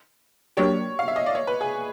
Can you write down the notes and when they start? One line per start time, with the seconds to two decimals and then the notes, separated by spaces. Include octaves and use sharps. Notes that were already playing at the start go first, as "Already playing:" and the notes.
0.57 F#3 A#3 D4 G4 C#5
0.99 F5
1.08 E5
1.16 D#5
1.26 D5
1.35 C#5
1.47 B4
1.61 G#4